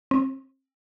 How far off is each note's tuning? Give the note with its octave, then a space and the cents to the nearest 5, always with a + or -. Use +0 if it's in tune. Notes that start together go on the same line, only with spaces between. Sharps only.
C4 +35